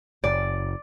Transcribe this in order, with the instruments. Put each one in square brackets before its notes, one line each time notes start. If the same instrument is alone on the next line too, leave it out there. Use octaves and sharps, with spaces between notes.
[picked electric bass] F#1 [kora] D5